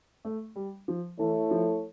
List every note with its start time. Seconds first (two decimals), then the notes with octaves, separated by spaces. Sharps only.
0.25 A3
0.56 G3
0.88 F3
1.19 E3 A3 E4 A4 C#5
1.51 F3